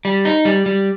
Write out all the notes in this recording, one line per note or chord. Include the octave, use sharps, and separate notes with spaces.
G3
D#4
G3
G3